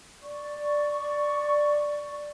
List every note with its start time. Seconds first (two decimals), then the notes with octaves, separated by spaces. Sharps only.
0.22 D5 C#6